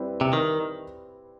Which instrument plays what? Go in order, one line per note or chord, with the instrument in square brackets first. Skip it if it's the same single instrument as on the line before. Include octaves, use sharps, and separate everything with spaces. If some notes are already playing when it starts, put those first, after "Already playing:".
Already playing: [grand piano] G3 C4 E4 B4
[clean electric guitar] C3
D#3